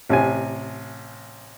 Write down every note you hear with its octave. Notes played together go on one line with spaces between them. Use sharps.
A1 C3 G#5